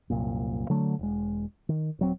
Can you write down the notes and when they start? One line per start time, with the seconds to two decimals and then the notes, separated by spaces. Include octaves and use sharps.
0.10 C2 F#2 A#2
0.70 D3 F#3 A3
0.99 E1 G#3
1.69 D#3
1.99 D#1 F#3 C4